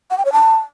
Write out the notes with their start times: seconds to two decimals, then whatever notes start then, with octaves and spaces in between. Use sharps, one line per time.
0.11 F#5
0.18 G5
0.25 C#5
0.33 A5